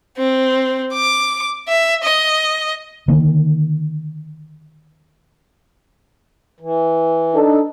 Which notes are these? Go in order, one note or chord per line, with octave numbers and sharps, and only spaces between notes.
C4
D6
E5
D#5
D3 D#3 A#3
E3
D4 D#4 A4